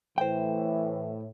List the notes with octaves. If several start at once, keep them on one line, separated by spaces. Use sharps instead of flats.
A2 E3 C5 G5